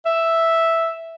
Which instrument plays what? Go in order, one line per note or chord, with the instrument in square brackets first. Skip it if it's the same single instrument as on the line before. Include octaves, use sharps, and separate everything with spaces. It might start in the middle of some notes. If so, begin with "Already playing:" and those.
[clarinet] E5